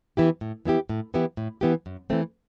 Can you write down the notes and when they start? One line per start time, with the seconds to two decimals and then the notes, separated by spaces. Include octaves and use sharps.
0.17 E3 B3 E4 G4
0.41 A2
0.65 E3 B3 E4 G4
0.89 A2
1.14 E3 B3 E4 G4
1.37 A2
1.61 E3 B3 E4 G4
1.86 F#2
2.10 E3 A3 C4